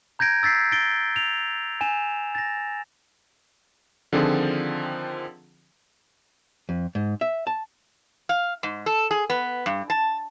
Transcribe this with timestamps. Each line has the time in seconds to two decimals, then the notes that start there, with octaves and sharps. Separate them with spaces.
0.19 A#5 G6 G#6 A#6 D7
0.43 E6 A6 B6 C7
0.72 A6 A#6 D7 G7
1.16 F7
1.81 G#5 E7
2.35 A6 A#6
4.13 D3 D#3 F3 C4 F4 G#4
6.69 F2
6.95 G#2
7.21 E5
7.47 A5
8.29 F5
8.63 G#2
8.86 A4
9.11 G#4
9.30 B3
9.66 G2
9.90 A5